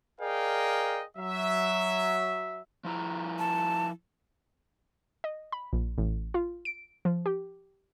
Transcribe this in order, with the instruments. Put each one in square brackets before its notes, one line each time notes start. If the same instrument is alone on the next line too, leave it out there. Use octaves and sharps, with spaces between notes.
[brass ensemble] G#4 A#4 D5 D#5 F5 G5
F#3 E5
[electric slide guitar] F3 E4 A#5
[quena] A5
[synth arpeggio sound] D#5
B5
A#1
A1
F4
D7
F3
G4